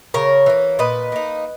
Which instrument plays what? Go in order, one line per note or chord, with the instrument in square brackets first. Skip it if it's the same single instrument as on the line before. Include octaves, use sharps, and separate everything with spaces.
[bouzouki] C#3 A#4 C#5
E3 A#3
A#2 B4 D#5
A#3 D#4